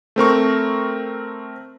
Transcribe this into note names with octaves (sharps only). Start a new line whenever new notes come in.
A3 C4 A#4 C#6